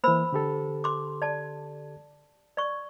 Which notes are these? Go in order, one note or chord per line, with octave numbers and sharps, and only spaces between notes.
E3 A#3 C5 B5 E6
D3 G4 A4
C6 D6
D5 A5
D5 C#6